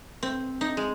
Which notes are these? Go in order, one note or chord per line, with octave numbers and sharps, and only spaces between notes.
C4
D#4
G#3